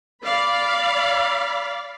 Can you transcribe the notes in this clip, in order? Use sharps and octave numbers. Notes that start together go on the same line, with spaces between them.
D5 F5 B5